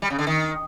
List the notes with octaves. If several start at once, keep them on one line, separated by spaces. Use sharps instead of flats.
G3
C#3
D3
D#3